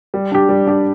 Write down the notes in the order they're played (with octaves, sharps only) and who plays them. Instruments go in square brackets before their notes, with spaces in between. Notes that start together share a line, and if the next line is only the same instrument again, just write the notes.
[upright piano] G3
D4 G4
G3
D4 G4